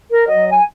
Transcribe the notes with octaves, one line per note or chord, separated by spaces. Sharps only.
A#4
F#3 D#5
G#5